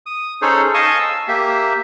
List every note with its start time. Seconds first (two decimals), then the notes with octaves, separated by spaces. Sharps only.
0.06 D#6
0.42 C#4 D#4 G#4 A4 C5 C#5
0.74 D#5 F5 G#5 A5 C#6 D#6
0.99 E6
1.28 A#3 G4 E5